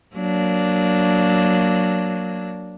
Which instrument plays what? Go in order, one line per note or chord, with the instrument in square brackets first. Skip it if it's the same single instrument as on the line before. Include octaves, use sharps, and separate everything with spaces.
[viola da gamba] F#3 A#3 D4